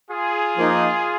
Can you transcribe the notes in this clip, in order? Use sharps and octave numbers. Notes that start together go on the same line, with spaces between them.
F4 G#4
F3 A#3 D#4